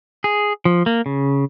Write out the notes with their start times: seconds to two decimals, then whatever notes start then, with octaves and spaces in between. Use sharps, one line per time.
0.24 G#4
0.65 F3
0.86 A#3
1.06 C#3